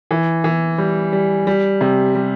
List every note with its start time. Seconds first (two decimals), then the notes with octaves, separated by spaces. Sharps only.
0.11 E3
0.44 E3
0.78 G3
1.13 G3
1.47 G3
1.81 C3
2.15 G3